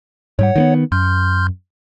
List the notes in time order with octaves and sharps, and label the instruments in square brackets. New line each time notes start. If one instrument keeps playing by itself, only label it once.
[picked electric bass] G#2 G3 [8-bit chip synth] C#5 F#5
[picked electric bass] D#3 A#3 B3
[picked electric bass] F#2 [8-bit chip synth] C6 F6 G6